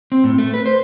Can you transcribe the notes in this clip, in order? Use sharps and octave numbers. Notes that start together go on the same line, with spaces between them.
C4
A2
A3
B4
C5